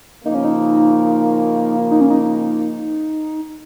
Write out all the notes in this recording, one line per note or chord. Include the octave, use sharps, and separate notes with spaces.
C#3 F3 A#3 D#4
C#4
D#4
D#4
C#4
D#4